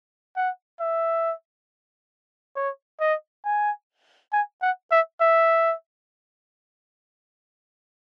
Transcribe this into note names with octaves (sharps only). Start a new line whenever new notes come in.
F#5
E5
C#5
D#5
G#5
G#5
F#5
E5
E5